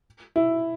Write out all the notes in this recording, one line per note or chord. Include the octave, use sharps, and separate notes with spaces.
E4